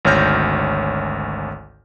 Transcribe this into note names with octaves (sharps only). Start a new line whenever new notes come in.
G#1 D2 C#5 F6 G6 A#6